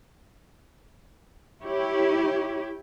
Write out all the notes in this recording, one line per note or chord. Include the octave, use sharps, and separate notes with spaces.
E4 G4 C#5